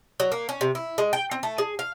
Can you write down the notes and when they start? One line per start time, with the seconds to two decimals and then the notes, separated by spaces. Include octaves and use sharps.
0.20 F#3
0.32 A#3
0.49 C#4
0.61 C3
0.75 E4
0.98 G#3
1.13 G5
1.31 C4
1.43 A3
1.58 G#4
1.79 F5